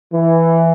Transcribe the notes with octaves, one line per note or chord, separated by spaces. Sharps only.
E3